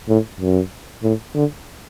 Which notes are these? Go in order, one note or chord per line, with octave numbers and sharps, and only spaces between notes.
A2
F#2
A2
D3